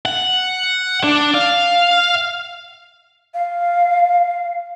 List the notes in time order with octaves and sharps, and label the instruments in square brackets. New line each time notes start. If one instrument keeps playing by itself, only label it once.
[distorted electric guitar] F#5
D4
F5
[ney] F5